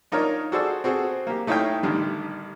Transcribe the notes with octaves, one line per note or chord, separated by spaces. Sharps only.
D4 D#4 F4 A#4 C#5
F#4 G#4 A4 C5 D5 E6
C4 F#4 G#4 A4
A#3 G4
A3 D#4 E4 C#5 F5 G5
A1 D3 D#3 G3